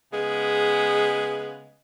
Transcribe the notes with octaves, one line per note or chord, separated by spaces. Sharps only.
C#3 G#3 B3